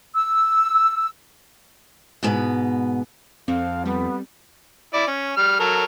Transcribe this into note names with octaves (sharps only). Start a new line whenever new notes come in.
E6
G#2 B2 B3
F2 C4 F5
G3 B3
E4 D5
C#4
G3 F6
F#3 A4 A#4